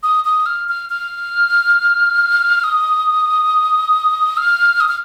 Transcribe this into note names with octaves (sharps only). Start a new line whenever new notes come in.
D#6
D#6
F6
F6
F6
D#6
F6
D#6
F6